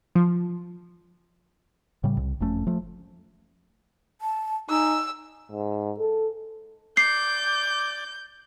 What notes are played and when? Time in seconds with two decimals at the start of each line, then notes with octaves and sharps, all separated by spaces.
0.15 F3
2.04 A2 C#3 G3
2.17 C2
2.40 F#1 F2 A3 C#4
2.67 F3 A3
4.21 A5
4.70 D#4 G#5 E6
5.52 G#2
5.99 A4
6.97 D5 D6 G6 C7